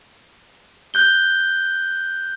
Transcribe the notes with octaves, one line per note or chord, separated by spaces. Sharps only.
F#6 G6 G7